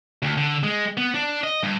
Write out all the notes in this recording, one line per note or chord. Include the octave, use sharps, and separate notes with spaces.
D2
D3
G#3
B3
D4
D#5
G2